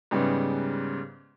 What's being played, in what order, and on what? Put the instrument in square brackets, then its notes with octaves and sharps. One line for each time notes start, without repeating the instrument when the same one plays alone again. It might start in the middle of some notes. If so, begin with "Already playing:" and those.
[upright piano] G#2 C#3 G3 B3